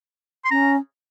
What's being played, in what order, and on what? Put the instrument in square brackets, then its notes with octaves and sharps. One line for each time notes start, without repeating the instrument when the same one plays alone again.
[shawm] C6
[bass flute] C#4 [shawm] A#5